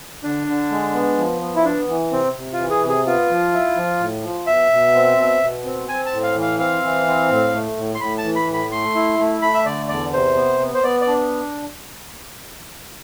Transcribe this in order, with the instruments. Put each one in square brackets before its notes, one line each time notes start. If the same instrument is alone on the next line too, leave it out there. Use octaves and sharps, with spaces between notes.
[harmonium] D3 [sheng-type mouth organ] D4
[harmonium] D3
G#3
B3
F3
B3
[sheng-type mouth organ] E4
[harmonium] B3 [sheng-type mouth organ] D4
[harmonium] E3
[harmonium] C3 [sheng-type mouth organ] C4
[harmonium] C3
[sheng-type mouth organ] F4
[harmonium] E3
[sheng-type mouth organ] G#4
[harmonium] C3
[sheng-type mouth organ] G#4
[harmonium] B3 [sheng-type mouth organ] F4
[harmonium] F3
E4
F3
A2
F3
[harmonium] B2 [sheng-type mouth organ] E5
[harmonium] B2
C4
B2
B2
C4
[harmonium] C4 [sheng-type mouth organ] G#5
[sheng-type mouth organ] A5
[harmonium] A2
[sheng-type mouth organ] F5
[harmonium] E3
[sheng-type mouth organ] F5
[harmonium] C4 [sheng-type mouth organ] F5
[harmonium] E3
C4
A2
A3
A2
[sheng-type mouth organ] C6
[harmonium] A2 [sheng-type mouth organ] B5
[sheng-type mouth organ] A5
[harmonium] E3
[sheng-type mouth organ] B5
[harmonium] A2
[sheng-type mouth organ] B5
[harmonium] A3 [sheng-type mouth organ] C6
[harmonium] E4
A3
[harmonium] A3 [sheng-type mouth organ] B5
[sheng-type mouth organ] E5
[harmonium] D3 [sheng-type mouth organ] D5
[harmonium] E2 [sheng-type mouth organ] D5
[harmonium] C3 [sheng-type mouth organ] C5
[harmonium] B3
B3
[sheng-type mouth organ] C5
[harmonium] B3 [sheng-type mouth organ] D5
[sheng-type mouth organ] D5
[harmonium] D4